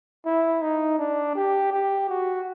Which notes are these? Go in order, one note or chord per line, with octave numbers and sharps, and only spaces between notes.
E4
D#4
D4
G4
G4
F#4